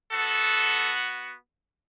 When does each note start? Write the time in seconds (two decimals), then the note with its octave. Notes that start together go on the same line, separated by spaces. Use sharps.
0.11 B3 F#4 A4